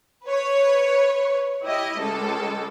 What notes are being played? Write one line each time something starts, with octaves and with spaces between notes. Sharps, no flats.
B4 C#5
E4 G4 D#5
C#2 G#3 A4